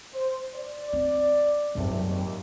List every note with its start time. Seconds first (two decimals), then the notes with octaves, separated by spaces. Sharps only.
0.13 C5
0.55 D5
0.93 C4
1.75 G#1 C#2 F#2 C3 A3
2.04 D#2 A#2